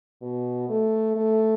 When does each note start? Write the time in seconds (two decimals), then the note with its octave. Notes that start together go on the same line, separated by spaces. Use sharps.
0.22 B2
0.69 A3
1.16 A3